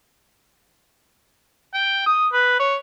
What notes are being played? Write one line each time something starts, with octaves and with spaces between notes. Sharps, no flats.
G5
D#6
B4
C#5